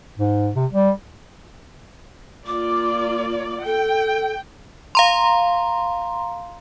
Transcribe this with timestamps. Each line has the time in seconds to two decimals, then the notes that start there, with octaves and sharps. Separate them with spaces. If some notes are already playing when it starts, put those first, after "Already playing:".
0.19 G#2
0.56 C3
0.71 G3
2.47 A#3 F4 D5 D6
3.65 A4 G5
4.95 F5 A#5 C6